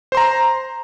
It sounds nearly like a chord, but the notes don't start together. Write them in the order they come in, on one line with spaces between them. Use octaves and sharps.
C5 C6 A#5